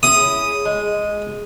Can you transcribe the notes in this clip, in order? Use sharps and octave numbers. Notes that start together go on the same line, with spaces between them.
C#4 E4 G#4 D#6
G#3